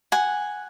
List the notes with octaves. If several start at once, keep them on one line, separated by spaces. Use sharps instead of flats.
F#5 G#5